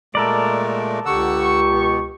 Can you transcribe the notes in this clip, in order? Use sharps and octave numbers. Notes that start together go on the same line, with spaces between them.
A#2 G#3 A3 A4 A#4 D5
C#2 D3 G4 F#5 C#6 E6
B2 B3